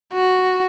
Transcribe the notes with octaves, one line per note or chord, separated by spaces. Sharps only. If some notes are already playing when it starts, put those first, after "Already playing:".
F#4